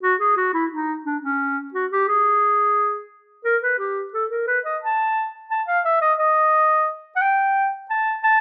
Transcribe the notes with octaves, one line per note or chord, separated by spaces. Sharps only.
F#4
G#4
F#4
E4
D#4
D4
C#4
F#4
G4
G#4
A#4
B4
G4
A4
A#4
B4
D#5
A5
A5
F5
E5
D#5
D#5
F#5
G5
A5
A5